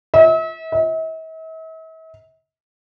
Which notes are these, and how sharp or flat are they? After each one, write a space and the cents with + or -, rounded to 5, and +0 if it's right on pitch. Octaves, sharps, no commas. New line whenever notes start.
E5 -40
E5 -45